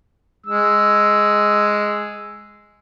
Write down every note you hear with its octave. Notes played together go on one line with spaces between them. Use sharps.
G#3 E6